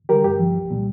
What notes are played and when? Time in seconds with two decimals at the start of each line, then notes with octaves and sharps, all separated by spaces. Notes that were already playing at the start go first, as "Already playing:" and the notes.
0.09 D3 G3 G4 A#4
0.24 G2 G4
0.39 F3
0.55 C2
0.71 A#2 G3